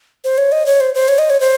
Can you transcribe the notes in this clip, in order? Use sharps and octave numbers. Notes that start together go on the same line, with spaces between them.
C5
C#5
D#5
C#5
C5
C5
C#5
D#5
C#5
C5